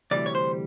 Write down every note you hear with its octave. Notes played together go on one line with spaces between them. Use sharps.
D2 C3 E3 G3 D5
C#5
C5